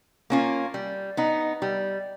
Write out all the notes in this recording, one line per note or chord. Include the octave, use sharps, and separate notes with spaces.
A#3 C#4 F4
G3
B3 D#4
G3